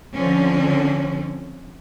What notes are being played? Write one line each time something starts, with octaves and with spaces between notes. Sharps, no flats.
D3 F3 C4 C#4